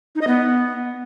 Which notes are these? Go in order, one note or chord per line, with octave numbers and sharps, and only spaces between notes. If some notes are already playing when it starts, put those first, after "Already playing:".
D#4
D#5
B3